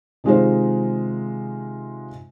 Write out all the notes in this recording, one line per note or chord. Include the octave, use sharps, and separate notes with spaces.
C3 D#3 G#3 D#4 F4 C5